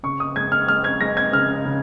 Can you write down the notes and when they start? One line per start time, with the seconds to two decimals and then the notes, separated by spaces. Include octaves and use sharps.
0.03 C#3 C#6
0.20 D#6
0.36 G#3 G#6
0.52 F6
0.68 G#3 F6
0.84 G#6
1.01 G#3 A#6
1.17 G#6
1.33 C#3 F6
1.65 C#3